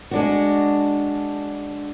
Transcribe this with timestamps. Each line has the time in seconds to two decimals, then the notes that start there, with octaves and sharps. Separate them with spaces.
0.11 G#3 D4 F#4